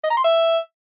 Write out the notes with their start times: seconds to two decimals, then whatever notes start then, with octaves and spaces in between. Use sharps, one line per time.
0.03 D#5
0.10 A#5
0.17 C6
0.24 E5